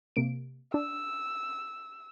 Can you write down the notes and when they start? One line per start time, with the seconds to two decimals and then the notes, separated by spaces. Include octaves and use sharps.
0.16 C3 A#3 D7
0.74 D4 E6